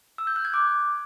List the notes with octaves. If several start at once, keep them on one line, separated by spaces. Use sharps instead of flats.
E6
G6
F#6
G#6
D6